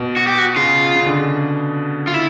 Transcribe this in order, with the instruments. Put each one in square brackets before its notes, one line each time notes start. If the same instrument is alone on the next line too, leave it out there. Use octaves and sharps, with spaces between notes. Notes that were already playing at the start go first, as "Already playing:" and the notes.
Already playing: [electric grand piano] B2
[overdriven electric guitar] F#4
G4
F#4
[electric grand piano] C#3 [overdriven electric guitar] F4
[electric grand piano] C#3
D3
C#3
[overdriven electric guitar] F4
E4